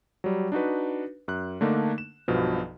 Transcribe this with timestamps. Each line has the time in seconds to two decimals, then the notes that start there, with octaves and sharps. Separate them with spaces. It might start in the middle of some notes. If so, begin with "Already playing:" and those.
0.24 F#3 G3
0.52 D4 D#4 F#4 B4
1.28 F#2 F#6
1.61 D3 A3 A#3 D4 D#4
1.98 E7
2.28 B1 G2 B2 F3